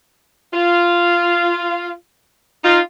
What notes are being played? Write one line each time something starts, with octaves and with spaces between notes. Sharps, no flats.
F4
D#4 F4